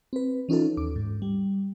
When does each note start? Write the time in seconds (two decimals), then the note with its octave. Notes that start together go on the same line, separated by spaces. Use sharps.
0.13 C4 B4
0.49 E3 C#4 D#4 F4 A4
0.77 D#2 D6
0.96 G#2
1.22 G3